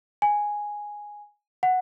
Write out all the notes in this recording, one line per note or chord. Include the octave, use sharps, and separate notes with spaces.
G#5
F#5